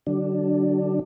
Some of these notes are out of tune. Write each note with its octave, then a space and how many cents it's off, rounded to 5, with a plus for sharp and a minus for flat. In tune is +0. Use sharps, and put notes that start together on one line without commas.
D3 +0 F#3 +35 D4 +10